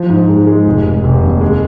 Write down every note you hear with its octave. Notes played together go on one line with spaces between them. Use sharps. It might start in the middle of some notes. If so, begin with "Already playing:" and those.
Already playing: F3
G#2
G#3
G#3
F1
F1
F1
D#2
G#3